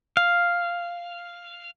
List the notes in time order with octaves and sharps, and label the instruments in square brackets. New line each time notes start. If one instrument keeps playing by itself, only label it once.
[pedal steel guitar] F5